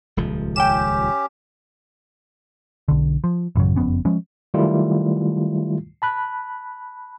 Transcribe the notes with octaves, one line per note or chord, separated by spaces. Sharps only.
D#1 C#2 F3
C#4 G4 G5 E7
B1 D3
F3
A1 F#2 C#3 F#3
F#1 F2 B3 C#4
F3 G#3 C#4
D#3 F#3 G3 A3 E4 F4
A5 B5 F#6